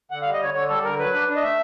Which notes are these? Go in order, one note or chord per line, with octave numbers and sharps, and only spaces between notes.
D3 F#5
F5
G3
D#5
D3 C#5
D3 C#5
G3 A4
D3 A#4
F#3 B4
D4
D4
D#5
A3 E5